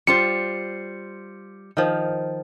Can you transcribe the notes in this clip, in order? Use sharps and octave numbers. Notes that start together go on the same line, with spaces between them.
G3 F4 C5 C#7
D#3 F3